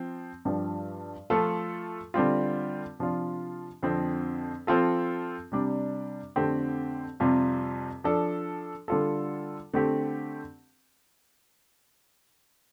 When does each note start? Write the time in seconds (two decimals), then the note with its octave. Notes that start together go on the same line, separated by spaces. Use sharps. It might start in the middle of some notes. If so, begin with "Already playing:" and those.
Already playing: F3 C4
0.45 G2 F3 D4 G4
1.30 F3 A3 F4 A4
2.14 D3 G3 C4 F4
2.99 C3 F3 D4 F4
3.83 F2 D3 F3 C4
4.67 F3 C4 F4 A4
5.52 C3 G3 D4
6.36 F2 D3 A3 C4 G4
7.20 F2 C3 G3 F4
8.04 F3 D4 A4
8.88 D3 G3 F4 A4
9.73 D3 A3 C4 G4